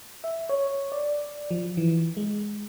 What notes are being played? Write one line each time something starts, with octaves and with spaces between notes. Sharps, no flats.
E5
C#5
D5
F3
E3
G#3